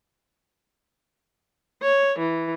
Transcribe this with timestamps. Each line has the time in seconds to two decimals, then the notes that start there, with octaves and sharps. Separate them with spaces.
1.82 C#5
2.19 E3